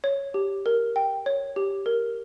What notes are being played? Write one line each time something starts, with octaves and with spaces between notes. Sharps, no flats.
C#5
G4
A#4
G5
C#5
G4
A#4